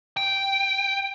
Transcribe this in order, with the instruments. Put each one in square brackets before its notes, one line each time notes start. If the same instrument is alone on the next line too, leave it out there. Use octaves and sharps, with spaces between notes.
[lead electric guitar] G5